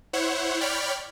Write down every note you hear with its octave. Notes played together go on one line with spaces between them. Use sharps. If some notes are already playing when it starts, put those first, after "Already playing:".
E4 C5 C#5 F#5
C#5 D5 G5 B5 F6